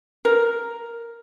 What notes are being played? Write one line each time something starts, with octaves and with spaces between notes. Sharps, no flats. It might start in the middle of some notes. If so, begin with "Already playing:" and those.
A#4